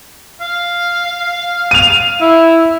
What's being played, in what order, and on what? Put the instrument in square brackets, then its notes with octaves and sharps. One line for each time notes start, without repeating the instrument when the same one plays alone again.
[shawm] F5
[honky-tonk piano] D#7 F7
[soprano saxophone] E4